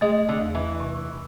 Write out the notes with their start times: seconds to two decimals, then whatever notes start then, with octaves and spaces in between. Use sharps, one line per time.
0.01 G#3 A3
0.29 D3
0.41 E2
0.55 E3
0.80 C3